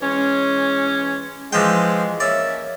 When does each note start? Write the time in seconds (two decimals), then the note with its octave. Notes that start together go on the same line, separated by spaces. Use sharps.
0.01 E3 G#3 C#4
1.52 E3 F3 G#3 G5
2.20 A#3 C#4 D5 E5